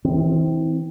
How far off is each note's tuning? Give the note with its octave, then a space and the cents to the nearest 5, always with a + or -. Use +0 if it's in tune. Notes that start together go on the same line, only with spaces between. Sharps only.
E3 -30 C4 +0